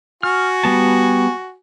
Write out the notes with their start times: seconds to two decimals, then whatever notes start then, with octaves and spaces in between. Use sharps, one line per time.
0.23 F#4 G#5 F6
0.64 G3 B3 A5